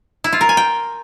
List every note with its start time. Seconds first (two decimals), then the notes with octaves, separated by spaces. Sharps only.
0.24 E4
0.33 F4
0.41 A#4
0.49 G#5
0.57 G5